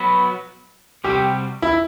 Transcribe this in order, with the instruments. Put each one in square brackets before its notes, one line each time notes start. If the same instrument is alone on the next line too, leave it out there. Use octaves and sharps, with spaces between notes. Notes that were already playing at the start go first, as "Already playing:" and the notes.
Already playing: [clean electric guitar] F#3 B3 F#4 B4
[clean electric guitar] C3 G3 C4 F#4 [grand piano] G4
[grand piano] E4